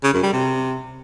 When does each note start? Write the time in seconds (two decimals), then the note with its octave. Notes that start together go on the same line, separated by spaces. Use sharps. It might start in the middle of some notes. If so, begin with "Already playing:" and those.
0.04 C#3
0.14 F#2
0.23 G3
0.33 C3